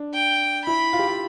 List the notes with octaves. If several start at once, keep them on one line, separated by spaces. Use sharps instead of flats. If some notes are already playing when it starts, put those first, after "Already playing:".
Already playing: D4
G5
E4 B5
F4
G4
F4